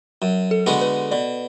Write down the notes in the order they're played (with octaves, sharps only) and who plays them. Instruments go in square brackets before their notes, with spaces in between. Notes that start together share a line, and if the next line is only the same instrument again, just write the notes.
[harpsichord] F#2
[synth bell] A4
[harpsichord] D3 G#3 B3 F#4
[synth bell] B4
[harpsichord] B2 [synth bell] D5